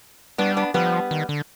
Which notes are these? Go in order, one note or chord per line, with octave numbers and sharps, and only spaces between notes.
G3 B3 D4
B3 D4
F3 G3 B3
D#3
D3